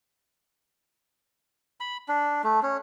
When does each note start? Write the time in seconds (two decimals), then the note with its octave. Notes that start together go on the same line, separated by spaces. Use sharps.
1.80 B5
2.08 D4
2.44 A3
2.63 C#4